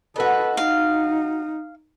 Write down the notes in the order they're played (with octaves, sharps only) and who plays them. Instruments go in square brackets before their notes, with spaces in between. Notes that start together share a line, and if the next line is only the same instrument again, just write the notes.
[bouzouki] F#4 D#5 [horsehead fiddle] A4 B4
[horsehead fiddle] D#4 [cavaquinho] F5